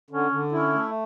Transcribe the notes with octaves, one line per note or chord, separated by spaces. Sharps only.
D3 C#4
D3
C#4 E4
A3